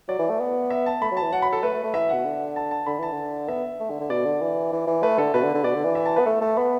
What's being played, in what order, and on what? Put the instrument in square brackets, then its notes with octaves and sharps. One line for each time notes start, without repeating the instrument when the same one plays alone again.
[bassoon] F#3 [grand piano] D5
[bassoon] E3
A3
B3
[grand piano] E5
A5
[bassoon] A3 [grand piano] B5
[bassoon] F#3
[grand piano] A5
[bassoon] E3
[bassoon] F#3 [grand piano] F#5
[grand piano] B5
A4
[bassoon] A3 [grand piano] B4
[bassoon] A3
A3
[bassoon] E3 [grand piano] E5
[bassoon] B2 [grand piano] F#5
[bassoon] D3
[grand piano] A5
A5
[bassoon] D3 [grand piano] B5
[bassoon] E3 [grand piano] A5
[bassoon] D3
[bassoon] B3 [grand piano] E5
[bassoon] A3
D3
D3
[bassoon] B2 [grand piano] D5
[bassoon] D3
E3
E3
E3
[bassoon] A3 [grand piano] B4
[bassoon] D3 [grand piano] A4
[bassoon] B2 [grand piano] B4
[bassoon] D3
D3
[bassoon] B2 [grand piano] D5
[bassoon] D3
E3
[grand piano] E5
A5
[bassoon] B3 [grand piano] B4
[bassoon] A3 [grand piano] A4
[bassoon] A3 [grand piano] A5
[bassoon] B3 [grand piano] B5